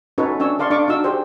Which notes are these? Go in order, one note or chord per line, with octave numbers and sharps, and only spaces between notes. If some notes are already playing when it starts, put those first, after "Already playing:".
C#4 D#4 F#4 A4 B4 C#5
C#4 D4 C#5 E6
A4 D5 F5 C6 C#6
D4 F5 C#6 D6
D4 D#4 F#4 E6
G4 G#4 C5